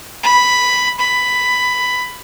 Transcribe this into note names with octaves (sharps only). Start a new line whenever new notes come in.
B5
B5